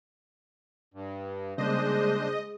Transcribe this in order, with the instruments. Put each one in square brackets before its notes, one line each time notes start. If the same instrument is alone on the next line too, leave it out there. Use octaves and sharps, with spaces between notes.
[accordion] G2
[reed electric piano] C#3 G3 A#3 [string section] G#3 [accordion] D4 C5 [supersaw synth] D#5